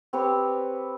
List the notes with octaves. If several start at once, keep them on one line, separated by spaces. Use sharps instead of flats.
C4 G4 B4 C#5